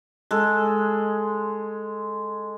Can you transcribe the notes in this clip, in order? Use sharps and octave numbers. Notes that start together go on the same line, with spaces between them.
G#3 A4